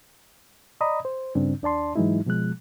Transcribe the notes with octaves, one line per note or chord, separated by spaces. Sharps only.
D5 D#5 A#5 B5 D#6
C5
G2 C#3 C4 D4
D#2 D4 D5 A5 C6
G#2 E3 F#3 G#3 D#4 E4
B2 F3 G#3 F#6